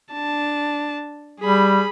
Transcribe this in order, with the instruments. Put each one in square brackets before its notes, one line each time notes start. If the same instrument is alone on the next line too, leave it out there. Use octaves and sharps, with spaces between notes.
[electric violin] D4 A5
[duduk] G3 [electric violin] G#4 B5